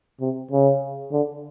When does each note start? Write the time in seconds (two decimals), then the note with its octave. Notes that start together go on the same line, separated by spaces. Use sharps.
0.20 C3
0.51 C#3
1.12 D3